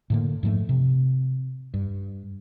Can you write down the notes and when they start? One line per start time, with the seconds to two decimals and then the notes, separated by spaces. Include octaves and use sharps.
0.10 A2 D3 A#3
0.43 G#2 F3 F#3 A3
0.69 C3
1.74 G2